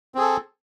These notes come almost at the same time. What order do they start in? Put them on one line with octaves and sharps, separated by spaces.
C4 G#4 A4